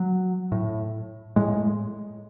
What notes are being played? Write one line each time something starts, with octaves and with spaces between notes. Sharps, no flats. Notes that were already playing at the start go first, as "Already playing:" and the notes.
Already playing: F#3
A2
A2 G#3